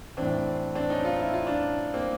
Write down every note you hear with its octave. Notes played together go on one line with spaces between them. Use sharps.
A2 E3 C4 D4
C4 D4
C#4 D#4
D#4 F4
E4
F4
D4 E4
A#3 C4